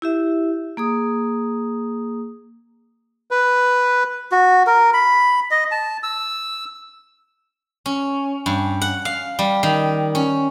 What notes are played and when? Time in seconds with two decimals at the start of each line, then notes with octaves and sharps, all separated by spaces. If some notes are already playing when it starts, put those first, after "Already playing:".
0.02 E4 G4 E5
0.77 A#3 G#4 D#6
3.31 B4
4.32 F#4
4.67 A#4
4.94 B5
5.51 D#5
5.72 A5
6.03 E6
7.86 C#4
8.46 G2
8.81 F#5
9.05 F5
9.39 G3
9.63 D#3
10.15 C#4